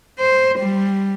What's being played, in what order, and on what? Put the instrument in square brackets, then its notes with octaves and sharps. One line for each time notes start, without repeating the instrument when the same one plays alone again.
[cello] C5
G3